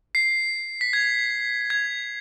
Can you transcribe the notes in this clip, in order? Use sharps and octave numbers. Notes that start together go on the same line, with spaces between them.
C7
B6
G#6
G#6